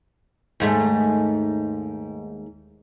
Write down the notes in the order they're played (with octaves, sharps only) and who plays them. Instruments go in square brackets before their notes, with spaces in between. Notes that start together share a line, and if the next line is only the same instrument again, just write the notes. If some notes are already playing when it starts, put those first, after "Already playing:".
[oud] D#2 G#2 A3